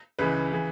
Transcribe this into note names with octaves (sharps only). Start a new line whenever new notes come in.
C#2 C#3 E3 B4
C#3 E3